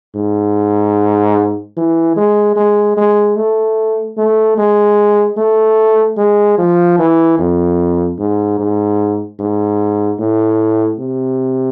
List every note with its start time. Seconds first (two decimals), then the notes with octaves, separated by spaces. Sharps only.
0.16 G#2
1.77 E3
2.17 G#3
2.56 G#3
2.97 G#3
3.37 A3
4.18 A3
4.58 G#3
5.37 A3
6.17 G#3
6.58 F3
6.98 E3
7.39 F2
8.19 G#2
8.59 G#2
9.40 G#2
10.19 A2
10.99 C3